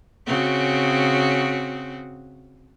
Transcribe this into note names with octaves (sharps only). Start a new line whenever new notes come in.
C#3 C4 F#4